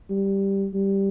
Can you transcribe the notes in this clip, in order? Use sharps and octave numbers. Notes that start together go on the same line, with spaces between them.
G3
G3